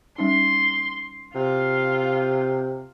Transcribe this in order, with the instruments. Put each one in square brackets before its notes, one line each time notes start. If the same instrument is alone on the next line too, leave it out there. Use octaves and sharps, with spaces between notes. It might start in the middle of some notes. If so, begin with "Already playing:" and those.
[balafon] G3 C#4 D#4 [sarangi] C6
[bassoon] C3 [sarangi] F4